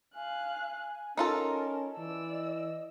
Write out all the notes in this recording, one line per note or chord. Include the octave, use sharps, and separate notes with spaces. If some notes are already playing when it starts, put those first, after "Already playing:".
F5 G#5 F#6
C#4 D#4 F4 A4 A#4 A5
E3 D5 E6
D#5